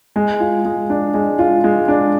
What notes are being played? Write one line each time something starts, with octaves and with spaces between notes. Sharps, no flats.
G#3
F4
G#3
D4
G#3
F4
G#3
D4